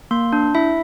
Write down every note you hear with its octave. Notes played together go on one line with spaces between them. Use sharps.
A#3 C6
D4
E4 E5